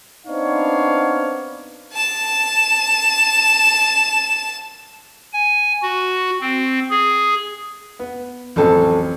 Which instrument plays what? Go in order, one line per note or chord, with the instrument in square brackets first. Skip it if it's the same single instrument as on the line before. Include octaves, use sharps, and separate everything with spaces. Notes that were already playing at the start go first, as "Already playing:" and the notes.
[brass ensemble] B3 C4 D4 D#4 C#5 F5
[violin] A5 E7
[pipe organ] G#5
F#4
C4
G#4
[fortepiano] B3
[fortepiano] A1 F2 [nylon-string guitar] F#3 A4